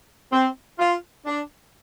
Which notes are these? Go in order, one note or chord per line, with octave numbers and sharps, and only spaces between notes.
C4
F4
D4